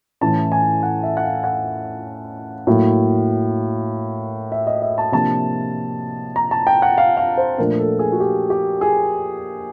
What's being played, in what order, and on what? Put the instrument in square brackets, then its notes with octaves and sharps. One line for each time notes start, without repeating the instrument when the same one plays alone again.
[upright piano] A2 E3 A3 C#4 A5
G#5
F#5
E5
F#5
F5
F#5
A2 F#3 A#3
E5
D#5
E5
A5
C3 F3 A#3 D4 A5
A#5
A5
G5
F#5
F5
F5
C5
A#2 F3 A3 D4 A#4
A4
G#4
F#4
G4
G4
G#4